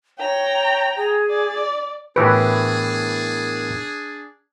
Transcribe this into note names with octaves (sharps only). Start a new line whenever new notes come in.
C#5 G5 A#5
G#4
D5
A2 E3 B3 D4 G4 G#4 A#4 B4